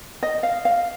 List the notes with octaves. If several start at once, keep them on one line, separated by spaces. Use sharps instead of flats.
D#5
F5
F5